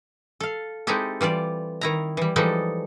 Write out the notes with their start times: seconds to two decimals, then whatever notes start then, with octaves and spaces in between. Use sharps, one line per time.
0.40 A4 F5
0.87 G#3 C4 D#4 E4 G4 A4
1.21 E3 G3 F4 D5
1.81 D#3 E4 A#5
2.17 E3 G3
2.36 E3 F3 G3 G#3 D#4 A4